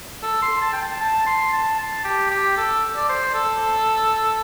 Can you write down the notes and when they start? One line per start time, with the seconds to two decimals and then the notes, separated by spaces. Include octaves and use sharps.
0.23 A4
0.42 C6
0.62 A5
0.73 G5
0.81 A5
1.01 A5
1.27 C6
1.53 A5
1.79 A5
2.04 G4
2.31 G4
2.57 A4
2.97 D5
3.09 C5
3.34 A4